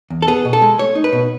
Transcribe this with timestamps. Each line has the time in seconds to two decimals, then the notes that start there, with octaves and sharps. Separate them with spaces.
0.10 E2
0.22 A4
0.27 B3 G#4
0.45 B2
0.53 A4
0.62 G#3
0.78 A3 C#5
0.95 D#4
1.04 B4
1.13 B2